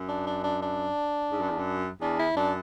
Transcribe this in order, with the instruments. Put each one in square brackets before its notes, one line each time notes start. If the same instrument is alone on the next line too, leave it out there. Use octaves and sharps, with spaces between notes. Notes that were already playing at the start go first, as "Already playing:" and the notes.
Already playing: [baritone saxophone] F#2
[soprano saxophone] D4
D4
D4
D4
[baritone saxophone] G#2
F#2
E2
F#2
[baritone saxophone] E2 [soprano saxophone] D4
[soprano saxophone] E4
[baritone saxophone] F#2 [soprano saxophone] D4